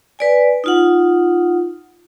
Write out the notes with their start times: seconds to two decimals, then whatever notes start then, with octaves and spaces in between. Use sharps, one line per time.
0.19 B4 D5 G#5
0.64 D#4 F4 F#5